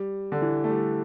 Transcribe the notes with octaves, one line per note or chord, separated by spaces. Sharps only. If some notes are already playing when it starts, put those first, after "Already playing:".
Already playing: G3
D3
E3
A3
G3